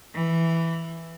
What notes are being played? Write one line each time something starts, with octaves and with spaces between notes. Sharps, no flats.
E3